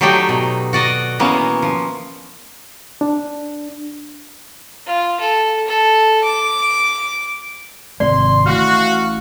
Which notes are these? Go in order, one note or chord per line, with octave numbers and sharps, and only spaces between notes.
F#3 A3 D#4 G4 D5 G5
B2
F#4 D5 D#5
B2 E3 A#3 B3 C#4
F3
D4
F4
A4
A4
D6
G#1 C3 G#3 D5 C6
A1 F#4 F5